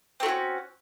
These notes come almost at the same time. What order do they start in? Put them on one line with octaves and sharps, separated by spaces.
C4 A3 F#4 C#4